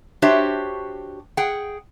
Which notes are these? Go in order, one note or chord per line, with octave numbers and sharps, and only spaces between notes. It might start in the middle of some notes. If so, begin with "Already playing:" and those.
D4 F#4 G4 C5 C#5 E5
G#4 F#5 G5